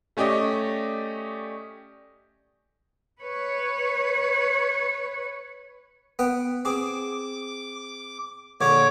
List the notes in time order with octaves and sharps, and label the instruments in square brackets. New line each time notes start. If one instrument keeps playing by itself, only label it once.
[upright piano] A3 C#4 G4 D5 D#5
[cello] B4 C#5
[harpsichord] B3 B4 G5
[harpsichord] C4 G#4 [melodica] D6
[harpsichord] A#1 D3 B5 [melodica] C#5 D6